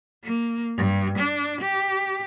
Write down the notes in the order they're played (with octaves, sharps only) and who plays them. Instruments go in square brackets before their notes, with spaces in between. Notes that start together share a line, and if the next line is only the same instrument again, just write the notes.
[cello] A#3
G2
D4
G4